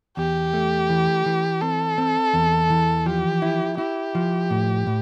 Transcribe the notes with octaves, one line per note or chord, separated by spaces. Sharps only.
E2 G4
A3
E3
E3
C4 A4
C4
E2
E3
F3 G4
E4
E4 G4
F3
A2
A2